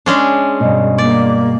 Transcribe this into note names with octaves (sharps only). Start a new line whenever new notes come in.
G#3 C#4 D4
G2 B2
A#3 D5